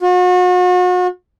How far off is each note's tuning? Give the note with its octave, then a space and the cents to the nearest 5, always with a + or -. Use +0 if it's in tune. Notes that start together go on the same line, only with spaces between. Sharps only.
F#4 -40